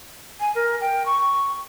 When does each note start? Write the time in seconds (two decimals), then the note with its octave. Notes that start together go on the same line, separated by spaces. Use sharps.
0.40 G#5
0.55 A#4
0.81 G5
1.06 C#6